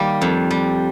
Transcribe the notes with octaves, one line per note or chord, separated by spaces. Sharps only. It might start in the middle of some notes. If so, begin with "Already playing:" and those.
Already playing: D#3 G3 A#3
F2
G3